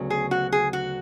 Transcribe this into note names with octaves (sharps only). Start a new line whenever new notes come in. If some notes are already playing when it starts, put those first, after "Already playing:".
Already playing: D2 C#3 F#3 B3
G#4
F#4
G#4
F#4